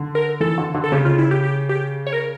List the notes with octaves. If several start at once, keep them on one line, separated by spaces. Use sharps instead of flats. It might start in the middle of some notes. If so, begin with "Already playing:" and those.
Already playing: D3
A#4
E3 A4
D3
D3
A4
C#3 G4
F4
E4
G4
G4
G4
C#5
A#4